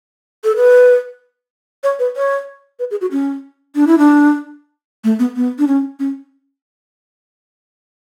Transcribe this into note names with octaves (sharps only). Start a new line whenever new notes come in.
A4
B4
C#5
B4
C#5
B4
G#4
F#4
C#4
D4
E4
D4
A3
B3
B3
D4
C#4
C#4